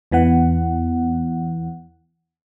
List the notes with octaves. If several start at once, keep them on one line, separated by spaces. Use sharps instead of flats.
E2 E3 B3 F#5